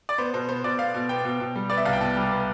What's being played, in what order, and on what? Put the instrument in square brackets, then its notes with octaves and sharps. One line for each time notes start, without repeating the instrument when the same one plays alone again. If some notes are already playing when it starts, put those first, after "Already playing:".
[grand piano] D5
B3 C5
B2 C5
B3 C5
B2 D5
B3 F5
B2
B3 G5
B2
B2
G3
B3 D5
E5
C2 F5
G5
B2 A5
G3
B3